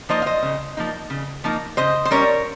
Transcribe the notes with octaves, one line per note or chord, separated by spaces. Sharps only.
F3 A#3 D#4 C5 D#5
F5
C5 D#5
C#3
F3 A#3 D#4
C#3
F3 A#3 D#4
C#3 C5 D#5
C5
G3 C#4 A#4 C#5